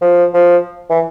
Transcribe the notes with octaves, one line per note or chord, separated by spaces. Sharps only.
F3
F3
E3